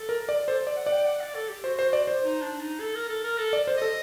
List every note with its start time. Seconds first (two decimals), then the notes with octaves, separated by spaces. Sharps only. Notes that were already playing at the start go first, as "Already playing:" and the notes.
Already playing: A4
0.09 A#4
0.29 D5
0.47 A4 C5
0.67 D5
0.76 F#5
0.86 D5
0.92 G5
1.06 F#5
1.21 D5
1.35 A4
1.49 G4
1.64 F#4 C5
1.79 C5
1.93 D5
2.07 C5
2.23 D#4
2.42 D4
2.61 D#4
2.80 A4
2.95 A#4
3.09 A4
3.24 A#4
3.38 A4
3.53 D5
3.67 C5
3.77 A4 D#5